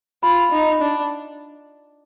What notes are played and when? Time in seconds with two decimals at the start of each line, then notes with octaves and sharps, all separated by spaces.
0.23 F4 B5
0.52 D#4
0.82 D4